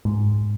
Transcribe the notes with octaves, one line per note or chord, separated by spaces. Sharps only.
G#2